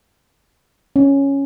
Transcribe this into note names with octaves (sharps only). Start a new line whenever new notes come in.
C#4